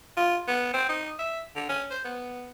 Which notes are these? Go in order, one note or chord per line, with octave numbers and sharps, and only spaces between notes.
F4
B3
C4
D#4
E5
D3
C#4
C5
B3